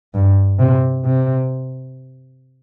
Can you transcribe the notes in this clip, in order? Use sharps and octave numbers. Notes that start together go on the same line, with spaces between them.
G2
C3
C3